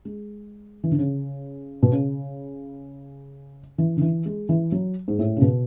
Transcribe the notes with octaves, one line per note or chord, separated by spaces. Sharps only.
G#3
E3
D3
C#3
B2
C#3
E3
D3
E3
G#3
E3
F#3
G#2
A2
C#3
B2